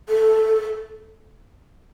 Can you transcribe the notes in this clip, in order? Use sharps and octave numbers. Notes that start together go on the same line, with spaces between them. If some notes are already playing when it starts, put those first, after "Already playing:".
A4